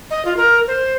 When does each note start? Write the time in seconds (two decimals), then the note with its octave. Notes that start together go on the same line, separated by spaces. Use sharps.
0.11 D#5
0.25 F4
0.37 A#4
0.67 C5